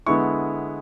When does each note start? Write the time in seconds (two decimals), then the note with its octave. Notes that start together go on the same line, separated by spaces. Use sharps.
0.07 D3 G#3 B3 E4 C#6